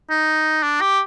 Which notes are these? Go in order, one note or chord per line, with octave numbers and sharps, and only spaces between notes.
D#4
D4
G4